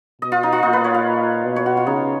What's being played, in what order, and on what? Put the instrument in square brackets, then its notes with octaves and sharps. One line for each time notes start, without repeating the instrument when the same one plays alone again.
[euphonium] B2 [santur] D#5
[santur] F4
D#4
F4
[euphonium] A#2 [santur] D#4
[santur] B4
C#5
F5
[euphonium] B2
[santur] C#5
F#4
F4
[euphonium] C#3 [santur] D#4